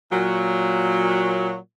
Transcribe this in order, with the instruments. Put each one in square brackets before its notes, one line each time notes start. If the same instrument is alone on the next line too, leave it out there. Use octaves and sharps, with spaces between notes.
[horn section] A#2 F#3